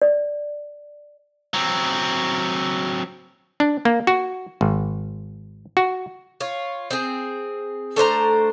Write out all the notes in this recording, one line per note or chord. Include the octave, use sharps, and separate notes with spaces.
D5
F#3 C4
D4
A#3
F#4
G#1
F#4
F4 C#5
C4 G#4
A3 D4 C5 A#5